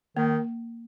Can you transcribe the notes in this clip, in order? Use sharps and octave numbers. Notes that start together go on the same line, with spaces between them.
D#3 A#3